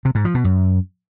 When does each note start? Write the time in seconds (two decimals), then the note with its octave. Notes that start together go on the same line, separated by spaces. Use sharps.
0.05 C3
0.15 G#2
0.25 F3
0.35 B2
0.44 F#2